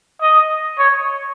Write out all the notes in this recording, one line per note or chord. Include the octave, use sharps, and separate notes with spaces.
D#5
C#5